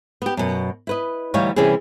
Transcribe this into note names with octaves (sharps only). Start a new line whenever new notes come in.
B3 G4
F#2 B2
E4 B4 D#5
D2 E3 G3 D#4 C#5 F5
C3 E3 G3 C#4 E4 G#4